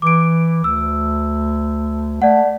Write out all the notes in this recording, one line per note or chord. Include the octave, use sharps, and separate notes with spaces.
E3 D6 D7
D2 E6
A3 D5 F#5